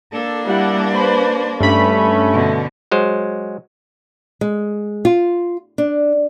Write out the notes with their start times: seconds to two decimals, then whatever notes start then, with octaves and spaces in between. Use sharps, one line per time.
0.13 A#3 D4 A4
0.46 G3 E4 F#5
0.92 B4 C5 B5
1.60 G2 A3 C#4 B5
2.32 B2 D3
2.91 F#3 G#3 C5
4.41 G#3
5.05 F4
5.78 D4